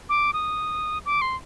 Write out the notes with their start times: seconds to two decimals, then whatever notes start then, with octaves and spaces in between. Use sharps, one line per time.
0.09 D6
0.33 D#6
1.06 D6
1.21 C6